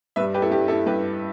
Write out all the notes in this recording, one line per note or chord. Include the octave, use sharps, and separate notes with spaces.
G2 G3 B4 E5
G4 B4
E4 A4
G2 G3 G4
E4 A4
G2 G3 G4 B4